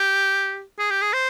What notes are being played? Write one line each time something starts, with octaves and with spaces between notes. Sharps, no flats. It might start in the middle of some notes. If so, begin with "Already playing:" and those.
Already playing: G4
G#4
G4
G#4
C5